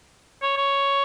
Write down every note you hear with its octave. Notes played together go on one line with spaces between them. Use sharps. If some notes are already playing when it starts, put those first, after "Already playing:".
C#5
C#5